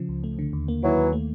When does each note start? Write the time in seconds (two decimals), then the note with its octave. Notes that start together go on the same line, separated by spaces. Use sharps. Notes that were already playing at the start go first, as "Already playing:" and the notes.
Already playing: C#3 F3
0.09 C#2
0.24 A3
0.39 D3
0.53 D#2
0.68 A#3
0.82 D#3 E3 F#3
0.98 D#2
1.13 A3